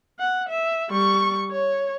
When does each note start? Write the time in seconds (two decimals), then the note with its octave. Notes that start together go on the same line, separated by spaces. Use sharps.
0.19 F#5
0.49 E5
0.90 G3 C#6
1.52 C#5